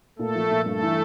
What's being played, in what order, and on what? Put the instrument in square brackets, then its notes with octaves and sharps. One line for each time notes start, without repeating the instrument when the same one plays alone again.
[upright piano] A#2 [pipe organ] A3 A4
[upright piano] F3
A#2
[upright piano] G2 [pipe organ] A3 A4
[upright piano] E3